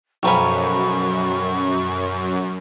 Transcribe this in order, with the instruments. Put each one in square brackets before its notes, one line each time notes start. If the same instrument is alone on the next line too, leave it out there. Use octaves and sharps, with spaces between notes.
[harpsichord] B1 F3 C#4 [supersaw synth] F#2 [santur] G5 A#5 B5 [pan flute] C#6